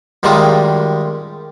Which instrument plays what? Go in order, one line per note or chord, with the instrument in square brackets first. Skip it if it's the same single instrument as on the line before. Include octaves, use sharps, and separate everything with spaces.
[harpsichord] F#2 D#3 G3 G#3 F4